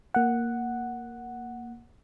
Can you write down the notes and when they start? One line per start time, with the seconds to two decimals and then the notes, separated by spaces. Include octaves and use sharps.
0.14 A#3 F#5